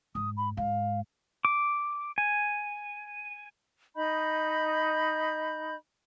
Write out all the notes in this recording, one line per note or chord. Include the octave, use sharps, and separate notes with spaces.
G#2 D#6
B5
G#2 F5
D6
G#5
D#4 D#5 B5 G6